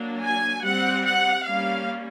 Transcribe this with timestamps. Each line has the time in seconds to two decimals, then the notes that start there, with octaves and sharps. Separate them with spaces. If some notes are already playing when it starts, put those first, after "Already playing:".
Already playing: F#3 A#3 D4
0.23 G#5
0.63 G3 C4 F#5
1.04 F#5
1.44 G3 A#3 C#4 F5